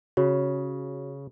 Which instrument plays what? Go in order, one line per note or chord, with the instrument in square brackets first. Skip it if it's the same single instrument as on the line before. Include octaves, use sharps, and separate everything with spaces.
[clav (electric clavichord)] C#3 [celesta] F#4 C#5